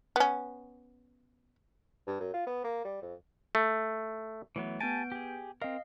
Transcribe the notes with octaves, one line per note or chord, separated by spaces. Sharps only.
B3 C#4
G2
F#2
F4
B3
A#3
G3
F2
A3
E3 F#3 A3 B3
B3 G4 G#5 A5 G6 D7
G4 G#4
C4 A#4 D#5 F5